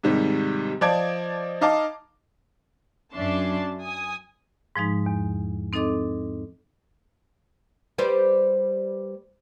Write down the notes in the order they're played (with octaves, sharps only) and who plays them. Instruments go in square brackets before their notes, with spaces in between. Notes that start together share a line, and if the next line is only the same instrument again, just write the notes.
[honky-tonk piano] G#2 C3 D#3 G3
F3 D5 D#5 A5 G#6 D7
D#4 D#5 F5 A5 D6
[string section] F#2 C#4 D4 E5 A5 C6
G#5 D#6
[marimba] G#2 F3 G#3 D#4
E2
C4 D#4 A4 D#5 D6
[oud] G3 B4 C5